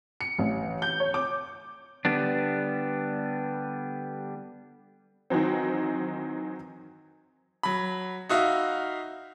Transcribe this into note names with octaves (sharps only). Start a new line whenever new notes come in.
C#7
A1
G6
C#5
D6
D3 G3 B3 D4
D#3 E3 F#3 C4
F#3 B5
D#4 F#4 E5 F5